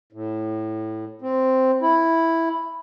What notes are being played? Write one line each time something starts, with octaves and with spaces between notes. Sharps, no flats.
A2
C4
E4